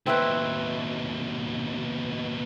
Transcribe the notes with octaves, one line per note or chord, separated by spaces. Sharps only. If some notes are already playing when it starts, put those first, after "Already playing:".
D#2 B2 C4 E4 B4